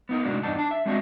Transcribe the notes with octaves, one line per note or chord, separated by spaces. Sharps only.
B3 D#4 A#4
A2 C3 G#3 D4 D#4 F#4
E2 G2 D4 D#4 A5
D4 A5
E5
G#3 C4 D4 F#4 D#5 E5